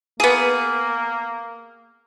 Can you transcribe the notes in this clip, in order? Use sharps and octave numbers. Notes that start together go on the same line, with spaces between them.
A#3 B3 G#4